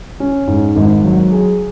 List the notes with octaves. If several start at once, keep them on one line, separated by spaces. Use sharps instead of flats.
C#4
G#2
G#1
F#3
G#4